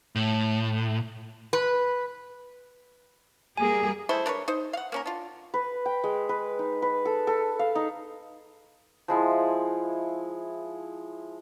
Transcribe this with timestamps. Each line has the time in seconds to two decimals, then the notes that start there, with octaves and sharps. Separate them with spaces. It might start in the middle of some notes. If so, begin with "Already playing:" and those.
0.15 A2
1.53 B4
3.57 G3 A#3 G#4 G#5
4.09 G#3 A3 E4 C5
4.26 D4 A#4 B4 C#5
4.48 D#4 C5
4.73 F5 F#5
4.92 A#3 C#4 A#4
5.06 D4 F4
5.54 B4
5.86 G5
6.04 G#3
6.29 B4
6.59 D#4
6.82 B4
7.05 A4
7.27 A4
7.59 F5
7.75 D#4
9.08 F3 G#3 E4